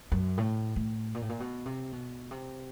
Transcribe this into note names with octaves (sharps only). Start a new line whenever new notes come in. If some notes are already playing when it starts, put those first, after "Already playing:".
F#2
A2
A2
A#2
A2
A#2
B2
C3
B2
C3